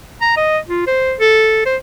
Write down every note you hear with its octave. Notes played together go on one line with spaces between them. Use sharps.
A#5
D#5
F4
C5
A4
C5